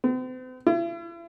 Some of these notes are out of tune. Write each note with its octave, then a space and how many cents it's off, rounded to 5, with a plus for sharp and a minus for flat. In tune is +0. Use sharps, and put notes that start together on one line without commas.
C4 -45
E4 +40